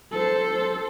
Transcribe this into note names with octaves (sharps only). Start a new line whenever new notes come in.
A4 C5